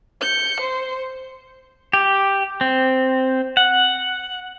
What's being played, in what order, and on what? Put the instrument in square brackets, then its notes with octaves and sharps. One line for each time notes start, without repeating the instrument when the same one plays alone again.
[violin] G6 C#7
C5
[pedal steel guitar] G4
C4
F#5